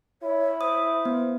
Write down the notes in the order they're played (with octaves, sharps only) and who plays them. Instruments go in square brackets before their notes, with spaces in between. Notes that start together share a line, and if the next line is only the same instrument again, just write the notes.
[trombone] E4 [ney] C#5
[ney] C5 [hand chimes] D#6
[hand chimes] B3